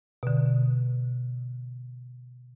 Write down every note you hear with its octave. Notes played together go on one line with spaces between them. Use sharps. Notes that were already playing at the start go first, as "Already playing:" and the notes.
B2 D3